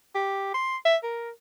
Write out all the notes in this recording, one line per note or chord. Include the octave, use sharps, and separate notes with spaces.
G4
C6
E5
A#4